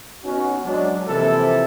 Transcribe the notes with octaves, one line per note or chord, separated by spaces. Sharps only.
B3 C#4 D#4 F#4
F#3 G#3 D4
C3 E3 F3 A#3 E4 A4